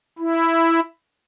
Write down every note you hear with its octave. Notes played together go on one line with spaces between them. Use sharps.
E4